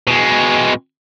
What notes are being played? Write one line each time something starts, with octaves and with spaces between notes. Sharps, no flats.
B2 G#3